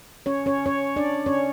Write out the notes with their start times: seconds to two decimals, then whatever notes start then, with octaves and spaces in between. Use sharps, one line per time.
0.26 C#4 C#5
0.46 C#4 C#5
0.66 C#4 C#5
0.96 D4 D5
1.26 C#4 C#5